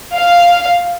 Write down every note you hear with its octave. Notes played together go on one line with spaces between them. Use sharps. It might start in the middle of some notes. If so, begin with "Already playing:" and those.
F5